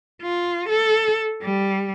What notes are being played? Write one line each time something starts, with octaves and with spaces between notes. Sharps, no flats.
F4
A4
G3